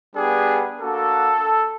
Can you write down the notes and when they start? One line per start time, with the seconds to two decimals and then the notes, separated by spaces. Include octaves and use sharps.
0.15 G3 B3 D4 G4 G#4
0.81 A#3 D4 F#4 A4